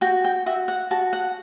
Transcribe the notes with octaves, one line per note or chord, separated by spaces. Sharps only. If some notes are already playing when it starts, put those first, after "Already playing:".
F#4 G5
G5
F#4 E5
F#5
F#4 A5
F#5